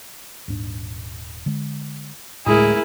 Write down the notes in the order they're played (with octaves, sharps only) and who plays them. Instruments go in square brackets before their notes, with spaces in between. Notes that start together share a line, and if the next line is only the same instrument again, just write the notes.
[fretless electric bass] D#1 G#2 D4
D3 G#3
[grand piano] D1 G#3 D#6 [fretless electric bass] A2 [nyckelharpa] E4 [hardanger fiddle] G#4 A#4